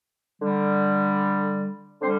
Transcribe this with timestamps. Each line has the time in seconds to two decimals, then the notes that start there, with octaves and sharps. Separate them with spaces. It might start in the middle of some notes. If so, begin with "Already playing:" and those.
0.42 D3 G3
2.02 D3 G3 C4 C5